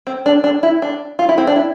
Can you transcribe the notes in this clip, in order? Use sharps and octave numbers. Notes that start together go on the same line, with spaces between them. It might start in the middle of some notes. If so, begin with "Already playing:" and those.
C4
D4
D4
E4
D4
F4
E4
C4
D4
E4